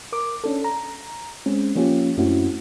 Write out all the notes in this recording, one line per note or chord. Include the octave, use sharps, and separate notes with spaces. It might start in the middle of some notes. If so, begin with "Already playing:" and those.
A#4 D6
C#4 D4 A4
A#5
G#3 C4 C#4
F3 A#3 C#4 F4 G4
F#2 A3 C4 C#4 E4 F#4